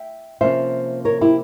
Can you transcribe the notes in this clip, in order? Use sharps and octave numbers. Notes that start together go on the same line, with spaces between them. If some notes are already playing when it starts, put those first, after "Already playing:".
Already playing: E5 G5
C3 F3 A#3 C#4 C5 E5
A#4 C#5
E4 G4